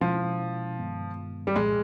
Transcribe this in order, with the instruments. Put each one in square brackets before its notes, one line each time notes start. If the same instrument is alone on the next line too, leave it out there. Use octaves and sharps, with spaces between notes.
[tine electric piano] B2 G#3 C#4 E4 [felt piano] F3
[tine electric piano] G2 D#3 G#3 B3
[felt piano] G3
[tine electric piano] C2 A#2 F3 [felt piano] G#3